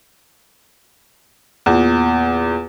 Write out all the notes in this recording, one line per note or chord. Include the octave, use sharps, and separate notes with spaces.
E2 A#2